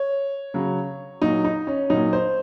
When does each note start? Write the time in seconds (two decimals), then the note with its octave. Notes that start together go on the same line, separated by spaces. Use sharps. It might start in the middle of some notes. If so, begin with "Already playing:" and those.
Already playing: C#5
0.54 C#3 F#3
1.22 A#2 F#3 D#4
1.45 D#4
1.67 C#4
1.90 A#2 F#3 D#4
2.13 C5